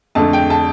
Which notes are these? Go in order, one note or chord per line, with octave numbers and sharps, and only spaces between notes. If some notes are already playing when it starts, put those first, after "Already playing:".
F2 D3 A3 A5
G5
A5